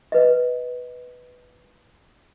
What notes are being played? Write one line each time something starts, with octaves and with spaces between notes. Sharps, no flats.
B4 D#5